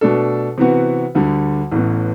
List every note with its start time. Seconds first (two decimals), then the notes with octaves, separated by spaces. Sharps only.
0.01 B2 A3 D4 A4
0.58 C3 E3 B3 F#4
1.15 D2 D3 G3
1.72 A1 A2 E3 B3